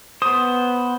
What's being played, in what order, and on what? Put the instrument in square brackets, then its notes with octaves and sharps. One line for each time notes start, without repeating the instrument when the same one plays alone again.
[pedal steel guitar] B3 C5 [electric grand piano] D#6